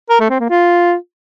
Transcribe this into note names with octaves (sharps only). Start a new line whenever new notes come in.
A#4
A3
C4
A#3
F4